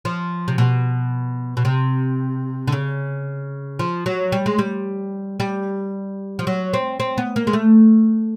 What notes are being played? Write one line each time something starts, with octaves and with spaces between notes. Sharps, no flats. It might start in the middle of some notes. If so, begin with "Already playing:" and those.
F3
C3
B2
B2
C3
D3
C#3
F3
F#3
G3
G#3
G3
G3
F3
F#3
C4
C4
B3
A#3
G#3
A3